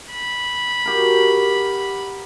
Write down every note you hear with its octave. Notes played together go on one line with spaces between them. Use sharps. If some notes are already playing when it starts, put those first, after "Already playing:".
B5
F#4 G4 A#4